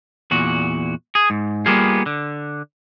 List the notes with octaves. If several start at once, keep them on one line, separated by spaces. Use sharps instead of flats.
E2 A#2 F#4
G#4
G#2
G3 A#3 B3 F4 G#4
D3